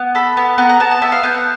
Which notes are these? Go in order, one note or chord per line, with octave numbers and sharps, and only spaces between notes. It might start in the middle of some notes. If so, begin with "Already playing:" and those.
Already playing: B3
A4 B5
B3
B3 A#5
A#5
B3 A5
A5
B3 E5
F5
B3 G5
F#5